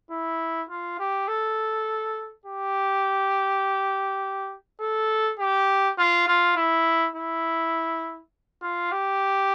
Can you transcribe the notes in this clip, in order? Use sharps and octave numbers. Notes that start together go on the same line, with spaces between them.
E4
F4
G4
A4
G4
A4
G4
F4
F4
E4
E4
F4
G4